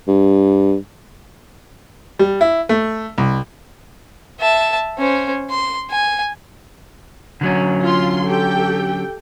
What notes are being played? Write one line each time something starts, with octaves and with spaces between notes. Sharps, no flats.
G2
G3
E4
A3
C2
E5 A5
C#4 C5
C6
G#5
D3 F#3 C#4
F4 C6
G4 A4 G5